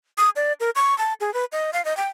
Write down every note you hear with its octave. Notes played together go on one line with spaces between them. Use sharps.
D#6
D5
A#4
C#6
A5
G#4
B4
D#5
F5
D#5
G5